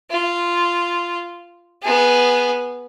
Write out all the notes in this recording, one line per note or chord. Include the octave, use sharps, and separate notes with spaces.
F4
B3 G#4